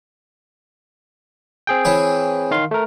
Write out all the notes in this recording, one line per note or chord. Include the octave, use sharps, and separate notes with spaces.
C4 G#4 G5
E3 B4 C#5
D#3 F5 C6
A3 A#4